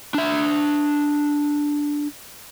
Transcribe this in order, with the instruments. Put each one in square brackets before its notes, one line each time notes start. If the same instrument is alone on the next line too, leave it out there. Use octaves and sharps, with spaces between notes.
[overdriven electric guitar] D4 E5